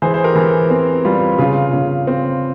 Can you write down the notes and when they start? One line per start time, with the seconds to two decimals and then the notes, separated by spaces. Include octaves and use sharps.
0.02 E3 G#4 C5
0.14 C5
0.24 G4 A#4
0.36 E3
0.70 C4
1.05 G3 F4
1.39 C#3 F4
1.73 C#3
2.07 C4